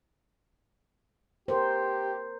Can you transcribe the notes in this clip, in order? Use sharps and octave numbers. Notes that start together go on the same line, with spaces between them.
G4 A#4 C5